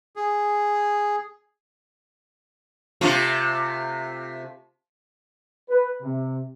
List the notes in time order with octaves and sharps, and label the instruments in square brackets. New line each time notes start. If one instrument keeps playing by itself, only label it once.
[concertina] G#4
[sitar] C3 A3 F4
[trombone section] B4
C3